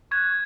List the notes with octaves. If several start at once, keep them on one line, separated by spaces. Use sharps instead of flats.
C#6 F#6 G#6